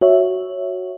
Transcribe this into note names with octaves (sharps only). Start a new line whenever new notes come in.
F#4 C#5 E5